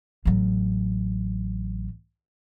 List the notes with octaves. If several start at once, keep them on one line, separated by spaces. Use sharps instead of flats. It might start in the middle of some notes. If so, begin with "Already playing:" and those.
A1 F#3